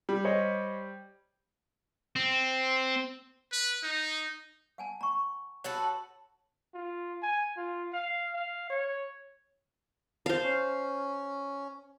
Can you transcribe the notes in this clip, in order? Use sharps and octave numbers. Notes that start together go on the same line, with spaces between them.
G3
C5 C#5 D#5
C4
B4
D#4
F#5 G#5 A5
A#5 C#6
F#4 A4 B4 C#5
F4
G#5
F4
F5
F5
C#5
C5 F5 A5
C#4